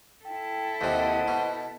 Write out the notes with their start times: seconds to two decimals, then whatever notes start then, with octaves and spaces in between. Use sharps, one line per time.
0.25 E4 A4 G5
0.81 D#2 C3 C5 D#5 F#5 A5
1.28 B2